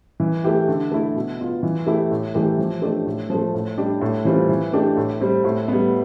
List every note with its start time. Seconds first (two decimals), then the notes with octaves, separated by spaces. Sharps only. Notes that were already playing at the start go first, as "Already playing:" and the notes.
0.20 E3
0.44 A3 E4 G4
0.68 D3
0.92 A3 E4
1.15 B2
1.40 B3 F4
1.63 E3
1.87 A3 E4 G4
2.11 A2
2.35 E3 A3 E4 G4
2.58 F3
2.82 A3 D4 G4
3.06 A2
3.30 F3 A3
3.54 A2
3.77 G3 D4 G4
4.01 A2
4.25 E3 G3 C4 F4
4.49 E3
4.73 A3 D4 G4
4.97 A2
5.21 G3 C4
5.44 A2
5.68 G3 B3